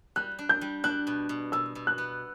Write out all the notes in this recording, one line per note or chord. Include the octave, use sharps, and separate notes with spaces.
G3 F#6
D4
G6
G3
D4 F#6
B2
B2
B2 E6
B2
F#6
B3